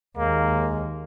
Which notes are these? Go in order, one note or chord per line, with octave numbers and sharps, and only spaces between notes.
D#2 G#3 A#3